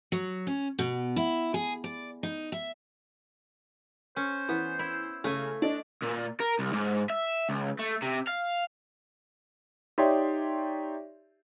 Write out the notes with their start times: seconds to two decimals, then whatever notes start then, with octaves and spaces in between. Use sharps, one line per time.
0.12 F#3
0.47 C#4
0.79 B2
1.16 E4
1.54 G#4
1.84 D5
2.23 D#4
2.52 E5
4.16 C#4 C5
4.49 E3 B3
4.79 E4
5.24 C#3 A3 G#5
5.62 D4 D5 D#5
6.02 A#2
6.40 A#4
6.59 C2
6.73 G#2
7.10 E5
7.49 C#2
7.79 A3
8.02 C3
8.27 F5
9.98 D#4 G4 C#5 D5 E5 C6